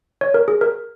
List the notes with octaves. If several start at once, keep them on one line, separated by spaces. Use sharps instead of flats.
C#5
A#4
G#4
A#4